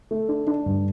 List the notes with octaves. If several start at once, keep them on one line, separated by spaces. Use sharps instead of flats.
A3
D4
D4
G2